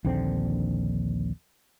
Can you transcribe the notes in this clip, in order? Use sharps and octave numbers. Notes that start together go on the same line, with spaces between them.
A#1 D#2 D3 C4